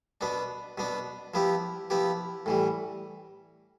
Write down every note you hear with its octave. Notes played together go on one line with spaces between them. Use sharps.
B2 B3 D4
B2 B3 D4
F3 B3 E4 G4
F3 B3 E4 G4
A2 E3 G3